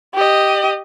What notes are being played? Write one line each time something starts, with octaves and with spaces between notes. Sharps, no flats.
G4 D#5